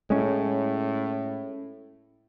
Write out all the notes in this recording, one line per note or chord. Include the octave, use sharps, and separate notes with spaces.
A2 G#3 C#4